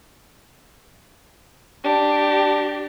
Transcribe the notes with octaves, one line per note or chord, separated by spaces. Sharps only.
D4 G4